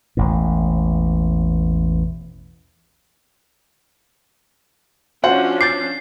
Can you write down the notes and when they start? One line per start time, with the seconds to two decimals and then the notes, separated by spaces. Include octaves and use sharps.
0.17 E1 A1 A2
5.24 F3 C#4 D4 F#4 C5 F#5
5.61 D6 G6 A6 C7